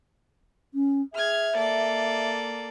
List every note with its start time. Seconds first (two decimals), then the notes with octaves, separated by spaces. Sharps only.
0.74 C#4
1.13 G#4 E5 F6 G#6
1.56 A#3 A4 D5